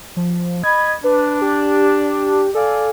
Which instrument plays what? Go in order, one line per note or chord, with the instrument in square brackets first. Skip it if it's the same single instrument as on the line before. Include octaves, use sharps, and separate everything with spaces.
[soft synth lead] F3
[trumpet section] D#5 B5 [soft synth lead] G#6
[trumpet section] D4 [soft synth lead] B4
[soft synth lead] G4
[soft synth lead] A4 [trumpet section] D5 F5 G#5